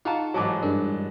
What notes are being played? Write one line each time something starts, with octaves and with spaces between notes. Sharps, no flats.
D#4 F4 G#4 F5 F#5 A5 A#5 C#6
A1 G#2 F#3 G#4 A5 D6
G2 G#3 D4 A#4